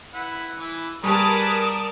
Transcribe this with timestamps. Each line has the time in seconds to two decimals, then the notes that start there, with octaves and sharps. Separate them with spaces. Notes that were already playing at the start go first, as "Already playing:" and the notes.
0.14 E4 B4 F#5
0.58 E3 E4
1.04 G3 G#4 A#4 B4 D5 A5 C#6 D#6